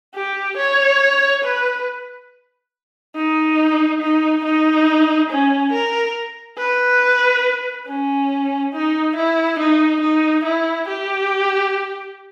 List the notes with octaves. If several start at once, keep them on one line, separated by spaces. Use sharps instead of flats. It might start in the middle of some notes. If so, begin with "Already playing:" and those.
G4
C#5
B4
D#4
D#4
D#4
C#4
A#4
B4
C#4
D#4
E4
D#4
D#4
E4
G4